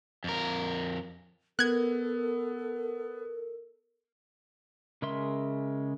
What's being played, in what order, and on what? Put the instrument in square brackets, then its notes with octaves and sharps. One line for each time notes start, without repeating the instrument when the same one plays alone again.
[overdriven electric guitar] F2 A#4
[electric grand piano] B3 [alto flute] A4 [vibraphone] A#4 [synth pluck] F#6 G#6
[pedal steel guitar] C#3 G#3 A#4 E5 C6